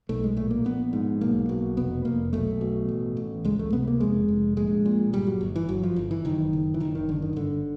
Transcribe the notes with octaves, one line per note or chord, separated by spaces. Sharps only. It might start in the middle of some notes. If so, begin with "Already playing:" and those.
B1 A3
G#3
A#2 A3
A#3
A#1 B3
G#2
B1 A#3
B2
F1 B3
F1 A#3
B1 A3
B2
A1
A1
C#2 G#3
A3
C3 B3
A#3
F1 G#3
F1
A#1 G#3
A#2
G1 G3
F#3
G1
E3
G1 F#3
F3
G1
E3
F#1 D#3
F#1
E3
F#1 D#3
D#3
F#1 D3
D#3
G1 D3